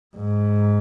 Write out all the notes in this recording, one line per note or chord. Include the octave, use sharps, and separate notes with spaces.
G#2